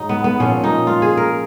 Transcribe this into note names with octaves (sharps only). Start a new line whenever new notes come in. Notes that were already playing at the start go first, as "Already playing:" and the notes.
Already playing: G#2 F#3 D#4
B3
B3
A#2 F3 C#4
D#4
F4
G#4
A#4